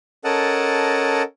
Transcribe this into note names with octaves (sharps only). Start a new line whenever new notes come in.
C#4 A4 A#4 D#5 F#5 A5